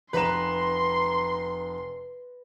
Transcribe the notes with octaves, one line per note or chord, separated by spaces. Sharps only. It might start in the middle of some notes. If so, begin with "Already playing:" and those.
F1 B4 A#5 C6 E7